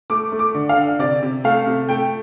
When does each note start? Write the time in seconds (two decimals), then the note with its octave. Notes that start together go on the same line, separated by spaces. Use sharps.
0.10 A3 D6
0.32 A3
0.39 D6
0.55 D3
0.69 F5
0.77 D3
0.99 C3 D5
1.22 C3
1.44 A3 F5
1.66 C3
1.89 A3 G5